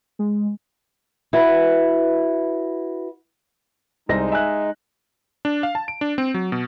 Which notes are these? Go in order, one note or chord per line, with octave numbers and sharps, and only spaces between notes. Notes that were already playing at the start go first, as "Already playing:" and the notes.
G#3
E4 F#4 B4
C2 G#3 D#4 C5 A#6
E5 G#5 F#6
D4
F5
A5
D7
D4
C4
F#3
B2